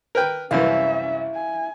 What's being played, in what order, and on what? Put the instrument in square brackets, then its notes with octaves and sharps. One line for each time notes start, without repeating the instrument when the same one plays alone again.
[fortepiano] A#4 B4 G5
[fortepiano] C2 F#2 E3 [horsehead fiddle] C#4 E5 [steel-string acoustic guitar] E4 F5
[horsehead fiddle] G#5